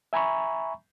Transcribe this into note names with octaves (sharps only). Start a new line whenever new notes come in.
E5 G#5 A#5 B5 C#6